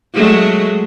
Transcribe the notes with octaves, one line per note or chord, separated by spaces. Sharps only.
F#3 G#3 A3